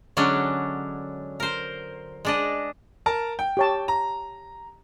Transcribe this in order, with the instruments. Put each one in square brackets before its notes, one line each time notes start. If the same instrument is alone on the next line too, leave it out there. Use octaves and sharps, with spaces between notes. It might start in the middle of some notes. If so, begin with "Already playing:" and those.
[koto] D3 F#3 G#3 C#4 D4
A#4 C5
G#3 D4 D#5
[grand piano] A#4 A5 A#5
G5
[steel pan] G4 C#5 A5
[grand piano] A#5